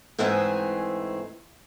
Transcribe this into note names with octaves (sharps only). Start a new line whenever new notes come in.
G#2 E3 G#3 A3 C4 G#4